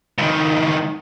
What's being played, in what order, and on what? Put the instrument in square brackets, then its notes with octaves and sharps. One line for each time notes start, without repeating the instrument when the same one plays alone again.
[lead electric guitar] C#2 D#3